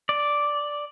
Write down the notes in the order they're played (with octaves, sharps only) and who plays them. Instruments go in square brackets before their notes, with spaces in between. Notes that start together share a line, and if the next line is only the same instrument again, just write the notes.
[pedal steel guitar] D5